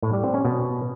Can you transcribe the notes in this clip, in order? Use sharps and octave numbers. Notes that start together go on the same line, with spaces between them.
A2
G3
C4
C#4
B2